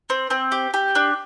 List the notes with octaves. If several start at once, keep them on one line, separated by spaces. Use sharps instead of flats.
C4
C4
G4
G4
D4